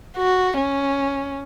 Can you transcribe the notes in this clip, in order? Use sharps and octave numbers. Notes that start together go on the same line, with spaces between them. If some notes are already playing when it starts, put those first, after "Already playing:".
F#4
C#4